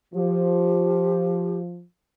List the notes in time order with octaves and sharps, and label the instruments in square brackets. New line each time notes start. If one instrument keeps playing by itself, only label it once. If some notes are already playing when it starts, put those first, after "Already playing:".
[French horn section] F3 [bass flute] G4